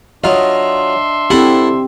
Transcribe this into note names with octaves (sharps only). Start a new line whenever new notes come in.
F#3 D4 F4 D#5 E5 C6
C4 E4 G4 A4 F#5